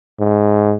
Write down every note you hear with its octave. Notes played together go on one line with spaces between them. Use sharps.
G#2